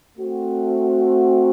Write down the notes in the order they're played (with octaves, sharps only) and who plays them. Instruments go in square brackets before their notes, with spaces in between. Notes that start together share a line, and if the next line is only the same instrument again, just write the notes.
[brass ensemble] A3 C4 F#4